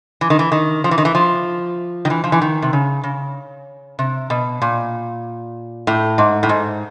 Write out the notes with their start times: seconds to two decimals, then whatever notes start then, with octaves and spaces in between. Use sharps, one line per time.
0.21 E3
0.30 D#3
0.39 E3
0.52 D#3
0.84 F3
0.91 E3
0.98 D#3
1.05 E3
1.15 F3
2.05 D#3
2.10 E3
2.24 F3
2.32 E3
2.41 D#3
2.62 C3
2.73 C#3
3.04 C#3
3.99 C3
4.30 B2
4.62 A#2
5.87 A2
6.18 G#2
6.43 A2
6.49 G#2